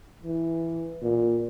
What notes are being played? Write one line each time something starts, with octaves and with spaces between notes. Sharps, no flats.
E3
A#2